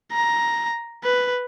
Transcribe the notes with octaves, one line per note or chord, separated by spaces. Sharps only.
A#5
B4